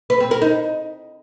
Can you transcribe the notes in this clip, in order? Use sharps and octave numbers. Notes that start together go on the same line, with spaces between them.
B4
C4
A#4
D#4